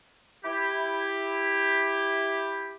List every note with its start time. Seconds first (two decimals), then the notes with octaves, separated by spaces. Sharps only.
0.44 E4 G4